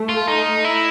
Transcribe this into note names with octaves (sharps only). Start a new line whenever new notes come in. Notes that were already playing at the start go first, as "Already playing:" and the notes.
Already playing: A3
F4
D#4
E4